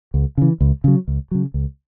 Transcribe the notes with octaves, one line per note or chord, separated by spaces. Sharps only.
C#2
C#3 E3
C#2
C#3 F#3
C#2
C#3 F#3
C#2